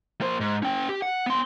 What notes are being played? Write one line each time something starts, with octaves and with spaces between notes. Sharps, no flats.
A#3 C5
G#2
C#4 G5
G4
F#5
B3 C6